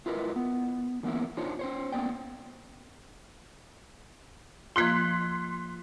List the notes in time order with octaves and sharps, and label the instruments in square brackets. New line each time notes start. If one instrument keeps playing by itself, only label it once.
[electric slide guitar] E4 F4 A#4 B4 D5 D#5
B3
E3 A#3 B3 C#4 E4
D4 D#4 F4 C5 C#5
C#4 C5 C#5
A#3 B3 C#4 D5 G5
[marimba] F3 A#3 F4 [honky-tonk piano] C6 F#6 B6